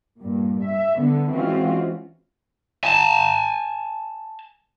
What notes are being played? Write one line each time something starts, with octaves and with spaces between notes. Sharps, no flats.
G2 A#2
E5
D3 B3
E3 G#3 C4 C#4 F4 F#4
G#5 A5